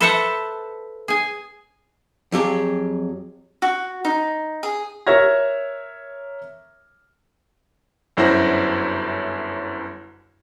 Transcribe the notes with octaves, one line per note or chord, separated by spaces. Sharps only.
A4 B4 C5 E5 F#5 A5
G#4 G#5
F2 F#3 G4 G#4
F#4
D#4
G#4
A#4 C#5 E5 F6 G#6 A#6
G1 F#2 E4 F#4 C5 A#6